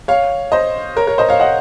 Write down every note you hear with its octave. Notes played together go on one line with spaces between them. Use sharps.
C#5 F5
C5 D#5
A#4 C#5
A#4 C#5
C5 D#5
C#5 F5
D#5 F#5